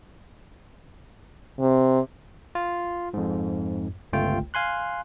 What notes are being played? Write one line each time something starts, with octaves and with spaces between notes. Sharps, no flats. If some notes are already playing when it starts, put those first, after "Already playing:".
C3
F4
F2 G#2
G1 C#2 A3 F4 G5
F5 G#5 C6 F#6